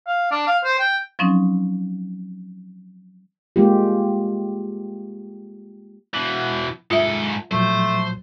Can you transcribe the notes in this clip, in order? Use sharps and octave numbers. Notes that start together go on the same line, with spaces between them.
F5
D4
F5
C5
G5
F3 F#3 C4 C#4 D#4
G#3 A#3 F4 G4
B2 E3
G#2 F4 A4 E5
A#2 F3 F#3 A3 C5